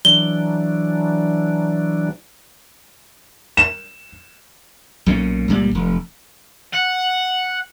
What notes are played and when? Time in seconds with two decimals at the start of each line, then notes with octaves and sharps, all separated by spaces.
0.05 E3 F#3 D4 G7
3.57 E7
5.06 B1 A#2 D3 C#4
5.48 C#2 A#2 G3
5.75 F1
6.74 F#5